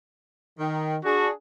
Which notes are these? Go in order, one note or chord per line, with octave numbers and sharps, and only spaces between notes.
D#3
D4 F#4 G#4